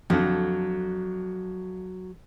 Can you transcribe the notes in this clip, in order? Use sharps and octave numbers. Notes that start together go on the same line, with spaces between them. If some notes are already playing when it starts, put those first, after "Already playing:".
F2 D3 F#3